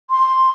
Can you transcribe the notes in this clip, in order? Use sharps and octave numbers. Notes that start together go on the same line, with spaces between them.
C6